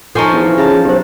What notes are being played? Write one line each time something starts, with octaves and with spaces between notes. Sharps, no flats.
F3 D#4 A4 C5 G#5 A5 C#6
E2 D4
E3
C#3 F4 A5 A#5
B1 G4 C5